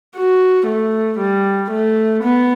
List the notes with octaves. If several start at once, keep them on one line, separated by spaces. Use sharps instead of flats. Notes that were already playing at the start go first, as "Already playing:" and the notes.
F#4
A3
G3
A3
B3